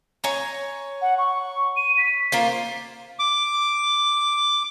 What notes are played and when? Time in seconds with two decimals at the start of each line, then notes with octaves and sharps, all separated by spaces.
0.24 C#5 G#5 A#5
1.01 F#5
1.18 C#6
1.77 D#7
1.98 B6
2.32 A#3 F4 C5
3.19 D6